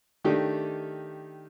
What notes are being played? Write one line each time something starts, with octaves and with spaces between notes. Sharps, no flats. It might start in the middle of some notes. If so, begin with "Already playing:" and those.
D#3 A3 D4 D#4 G4